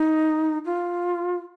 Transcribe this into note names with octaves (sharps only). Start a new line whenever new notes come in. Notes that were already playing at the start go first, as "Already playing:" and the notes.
Already playing: D#4
F4